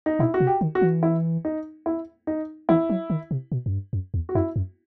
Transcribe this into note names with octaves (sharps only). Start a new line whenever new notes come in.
D#4
B2 E4
F#4
C3
G4
D#3
F#4
E3
E4
D#4
E4
D#4
E3 E4
F#3
D#3
C3
B2
F#2
G2
F#2
E2
F#4
F#2 E4
F#2